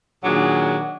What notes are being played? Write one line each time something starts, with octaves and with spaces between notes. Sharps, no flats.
A#2 D#3 F#3 D4 G#4